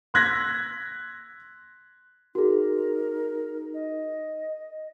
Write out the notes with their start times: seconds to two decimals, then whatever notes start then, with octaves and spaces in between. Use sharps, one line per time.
0.14 C6 E6 F#6 G#6 A#6 B6
2.35 D#4 F#4 G#4 A#4
3.74 D#5